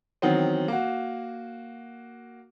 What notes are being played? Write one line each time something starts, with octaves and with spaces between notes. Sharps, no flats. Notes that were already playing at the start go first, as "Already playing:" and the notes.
D#3 E3 F#3 B3 C4
A#3 F#4